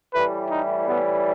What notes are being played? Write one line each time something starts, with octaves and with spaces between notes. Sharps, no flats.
A2 E3 G3 B4
D#4
A2 E3 G3 B3